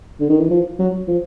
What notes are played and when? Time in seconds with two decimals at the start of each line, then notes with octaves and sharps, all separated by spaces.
0.20 D3
0.30 D#3
0.40 E3
0.51 F3
0.79 F#3
1.08 F3